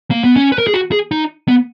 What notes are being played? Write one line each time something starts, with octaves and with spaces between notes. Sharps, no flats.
A#3
B3
C#4
B4
A#4
G#4
F#4
G#4
D#4
B3